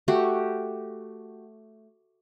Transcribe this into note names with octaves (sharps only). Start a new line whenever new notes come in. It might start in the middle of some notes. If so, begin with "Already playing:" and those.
A3 F#4 G4